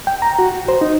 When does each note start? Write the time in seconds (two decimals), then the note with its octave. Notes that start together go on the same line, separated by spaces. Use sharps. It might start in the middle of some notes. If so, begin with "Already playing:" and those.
0.07 G5
0.22 A#5
0.39 F#4
0.68 C5
0.81 D#4